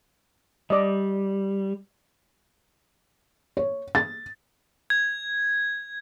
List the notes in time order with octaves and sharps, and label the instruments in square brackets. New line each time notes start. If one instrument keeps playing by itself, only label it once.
[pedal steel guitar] G3 [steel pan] D5 D#5
[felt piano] C#5
A6
[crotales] G#6